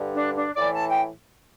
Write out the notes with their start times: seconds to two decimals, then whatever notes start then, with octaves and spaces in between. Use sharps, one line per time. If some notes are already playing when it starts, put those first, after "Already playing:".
Already playing: G2 D3
0.13 D4
0.35 D4
0.56 A2 E3 D5
0.73 A5
0.88 G5